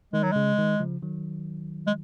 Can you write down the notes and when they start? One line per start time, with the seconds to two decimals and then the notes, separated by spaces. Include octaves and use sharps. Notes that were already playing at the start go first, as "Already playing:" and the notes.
0.13 D#3 G#3
0.23 F#3
0.32 C#3 G#3
0.58 D#3
0.80 C#3 F3
1.03 D#3 F#3
1.87 G#3